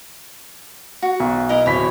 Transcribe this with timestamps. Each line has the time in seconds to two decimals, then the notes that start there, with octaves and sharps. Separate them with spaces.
1.02 F#4
1.20 B1
1.49 E4 A#4 D#5
1.66 D1 C#5 B5 B6